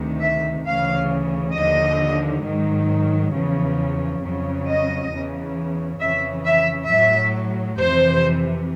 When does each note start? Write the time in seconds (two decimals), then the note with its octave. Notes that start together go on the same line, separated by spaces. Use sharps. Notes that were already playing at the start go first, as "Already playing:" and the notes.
Already playing: D2 C3 D#3
0.23 E5
0.66 D2 C#3 E3 F5
1.55 D#2 D3 F3 D#5
2.45 G#2 D#3 F#3
3.33 E2 C#3 F3
4.21 F2 C#3 F#3
4.67 D#5
5.11 E2 C#3 E3
5.99 F2 C#3 E3 E5
6.44 E5
6.89 A2 F#3 E5
7.77 F2 C3 E3 C5